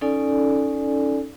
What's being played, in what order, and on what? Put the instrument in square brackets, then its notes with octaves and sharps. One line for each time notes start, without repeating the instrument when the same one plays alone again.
[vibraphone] C#4 D#4 A4 D5 G#5